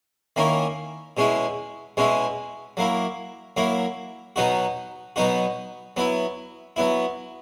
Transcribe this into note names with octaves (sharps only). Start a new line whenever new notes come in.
D#3 A#3 C#4 E4
B2 G#3 C#4 E4
B2 G#3 C#4 E4
F#3 A#3 E4
F#3 A#3 E4
B2 F#3 B3 D#4 F#4
B2 F#3 B3 D#4 F#4
F#3 B3 E4
F#3 B3 E4